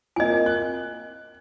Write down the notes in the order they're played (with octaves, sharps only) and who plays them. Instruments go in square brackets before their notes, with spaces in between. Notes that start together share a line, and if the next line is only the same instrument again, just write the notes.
[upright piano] A#3 C4 F4 [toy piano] D#5 G#5
[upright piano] F#6